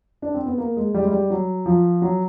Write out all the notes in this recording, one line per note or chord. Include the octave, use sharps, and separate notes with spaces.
D4
C4
B3
A#3
G#3
G3
G#3
G3
F#3
F3
F#3